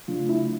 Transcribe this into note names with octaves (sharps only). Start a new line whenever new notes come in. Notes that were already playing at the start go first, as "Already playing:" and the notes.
C#3 F#3 A3 D4 F4
E4